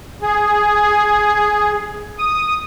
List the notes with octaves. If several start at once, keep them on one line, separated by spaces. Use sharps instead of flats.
G#4
D#6